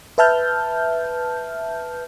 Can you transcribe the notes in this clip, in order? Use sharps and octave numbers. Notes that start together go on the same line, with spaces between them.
B4 E5 A5 F6 G6